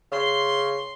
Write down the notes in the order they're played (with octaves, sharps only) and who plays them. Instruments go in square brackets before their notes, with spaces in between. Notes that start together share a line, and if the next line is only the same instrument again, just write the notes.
[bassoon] C#3 [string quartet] C6